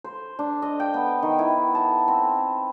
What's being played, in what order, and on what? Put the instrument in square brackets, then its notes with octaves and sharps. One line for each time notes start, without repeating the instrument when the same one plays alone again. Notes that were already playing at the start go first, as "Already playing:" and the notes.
[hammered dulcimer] C5
D4
D#5
G5
B3
D#3
E4
A5
C4